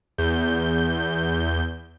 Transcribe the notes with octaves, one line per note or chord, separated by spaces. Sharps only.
E2 G6